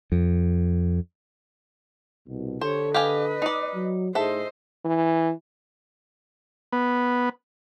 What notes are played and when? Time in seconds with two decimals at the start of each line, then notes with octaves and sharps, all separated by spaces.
0.12 F2
2.28 C2 B2
2.61 D3 G4 A4 C5 C#5
2.94 G4 B4 D#5 F5 G#5
3.42 D#4 D5
3.75 F#3
4.15 A2 D#4 G#4 A4 C5 D#5 E5
4.85 E3
6.72 B3